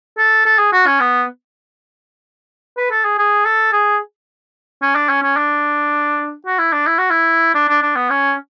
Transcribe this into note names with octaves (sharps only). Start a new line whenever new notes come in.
A4
A4
G#4
F#4
C#4
B3
B4
A4
G#4
G#4
A4
G#4
C#4
D4
C#4
C#4
D4
F#4
E4
D4
E4
F#4
E4
D4
D4
D4
B3
C#4